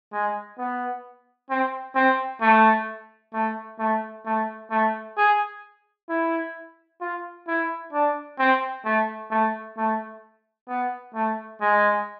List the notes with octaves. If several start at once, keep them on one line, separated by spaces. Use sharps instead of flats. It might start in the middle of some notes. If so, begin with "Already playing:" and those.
G#3
B3
C4
C4
A3
A3
A3
A3
A3
G#4
E4
F4
E4
D4
C4
A3
A3
A3
B3
A3
G#3